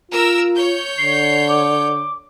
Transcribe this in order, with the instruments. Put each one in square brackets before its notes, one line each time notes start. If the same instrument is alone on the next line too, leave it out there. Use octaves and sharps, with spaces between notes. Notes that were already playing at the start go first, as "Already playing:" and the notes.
[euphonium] F4 [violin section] A#4 E6
[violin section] C#5 G6
[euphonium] D3 [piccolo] C7
[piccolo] D6